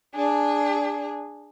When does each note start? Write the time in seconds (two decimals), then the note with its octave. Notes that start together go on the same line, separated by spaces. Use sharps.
0.13 D4 G#4